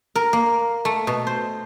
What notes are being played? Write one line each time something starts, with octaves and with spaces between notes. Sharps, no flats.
A#4
A#3
A3
B2
C5